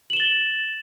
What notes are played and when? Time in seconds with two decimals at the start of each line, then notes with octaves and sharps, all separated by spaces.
0.10 F#7
0.13 E7
0.17 G7
0.20 A6